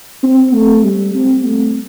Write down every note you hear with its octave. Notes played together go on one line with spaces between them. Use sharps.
C4
A3
G3
C4
A3